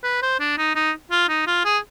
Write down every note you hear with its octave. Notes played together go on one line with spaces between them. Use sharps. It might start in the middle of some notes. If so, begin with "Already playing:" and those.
B4
C5
D4
D#4
D#4
F4
D#4
F4
G#4